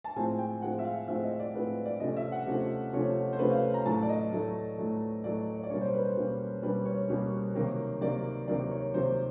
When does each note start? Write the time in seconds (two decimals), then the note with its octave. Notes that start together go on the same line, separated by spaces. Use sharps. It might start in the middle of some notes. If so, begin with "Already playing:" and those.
0.04 A5
0.16 A2 F3 G#3 C4 G#5
0.39 G5
0.62 A2 F3 G#3 C4 F#5
0.79 E5
0.85 F5
1.08 A2 F3 G#3 C4 E5
1.24 D#5
1.40 D5
1.54 A2 F3 G#3 C4 B4
1.85 D5
2.00 C3 F3 A3 C#4 D#5
2.17 E5
2.32 F#5
2.46 C3 F3 A3 C#4
2.93 C3 F3 A3 C#4 C#5
3.33 C5
3.39 C3 F3 A3 C#4 B4
3.51 F5
3.74 A#5
3.85 A2 F#3 A3 A5
4.03 D5
4.09 D#5
4.32 A2 F#3 A3
4.78 A2 F#3 A3
5.24 A2 F#3 A3 D5
5.54 C#5
5.63 D5
5.70 B2 G3 A#3 C#4 C#5
5.81 C5
5.94 B4
6.05 C5
6.17 B2 G3 A#3 C#4
6.63 B2 G3 A#3 C#4 B4
6.85 C#5
7.08 B2 G3 A#3 C#4
7.55 C3 D#3 F#3 A#3
8.01 C3 D#3 F#3 A#3 D5
8.48 C3 D#3 F#3 A#3 D5
8.71 C#5
8.93 C3 D#3 F#3 A#3 C5